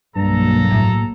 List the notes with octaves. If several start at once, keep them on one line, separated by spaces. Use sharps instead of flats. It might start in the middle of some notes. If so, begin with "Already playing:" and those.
B1 G2 F#3 A#3 A4 A#5
A2